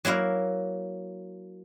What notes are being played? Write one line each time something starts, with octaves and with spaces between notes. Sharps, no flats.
F#3 A#3 E4 F5